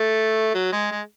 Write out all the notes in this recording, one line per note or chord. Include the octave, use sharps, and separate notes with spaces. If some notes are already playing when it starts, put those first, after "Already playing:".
Already playing: A3
F#3
G#3
G#3